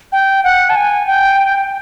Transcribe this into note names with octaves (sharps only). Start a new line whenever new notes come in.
G5
F#5
A5
G#5
G5